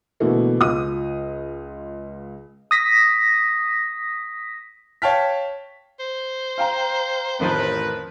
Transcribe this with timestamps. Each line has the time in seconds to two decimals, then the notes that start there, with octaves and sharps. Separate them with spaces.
0.20 B2 D3 E3 A3 A#3
0.60 C#2 F4 D#6
2.71 D#6 A#6 B6
5.02 C#5 F5 G5 A5 F6 B6
6.00 C5
6.58 F5 G5 A#5
7.40 A1 F2 D#3 F3 A#4 B4